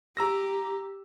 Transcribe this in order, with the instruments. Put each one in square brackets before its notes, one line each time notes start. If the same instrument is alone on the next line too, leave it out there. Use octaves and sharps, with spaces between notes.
[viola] G4 [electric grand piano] A#5 E6 A#6